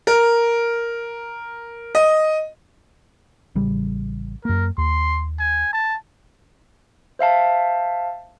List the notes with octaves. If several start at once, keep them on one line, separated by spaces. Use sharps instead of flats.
A#4
D#5
A1 C#3 G3
F#2 A#3 A#4
D#2 C6
G#5
A5
C5 E5 F5 A5